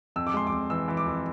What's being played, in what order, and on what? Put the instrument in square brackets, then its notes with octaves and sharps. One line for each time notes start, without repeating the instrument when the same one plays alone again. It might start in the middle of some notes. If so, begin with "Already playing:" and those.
[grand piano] F2 E6
D6
G#3 C6
D6
F2
E3 E6
E3
D6
F2